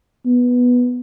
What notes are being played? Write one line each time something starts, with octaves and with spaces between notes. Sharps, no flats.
B3